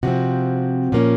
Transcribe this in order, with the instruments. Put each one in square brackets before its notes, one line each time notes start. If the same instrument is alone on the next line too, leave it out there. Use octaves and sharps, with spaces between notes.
[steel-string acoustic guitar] C3 F3 C4 F#4
A#2 F3 A#3 C#4